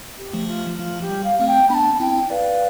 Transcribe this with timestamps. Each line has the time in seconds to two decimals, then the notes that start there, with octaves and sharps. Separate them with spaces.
0.18 G4
0.33 F3 A3
0.48 F4
0.79 F3 F4
1.01 G4
1.09 G3
1.24 F5
1.39 A3 C4 F5
1.48 G5
1.70 B3 D4 A5 B5
2.00 C4 E4 G5
2.30 B4 D5 F5